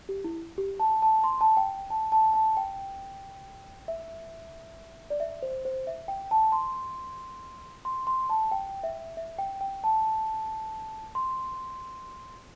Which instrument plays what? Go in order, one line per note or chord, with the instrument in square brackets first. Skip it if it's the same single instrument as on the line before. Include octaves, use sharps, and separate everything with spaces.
[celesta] G4
E4
G4
A5
A5
C6
A5
G5
A5
A5
A5
G5
E5
D5
E5
C5
C5
E5
G5
A5
C6
C6
C6
A5
G5
E5
E5
G5
G5
A5
C6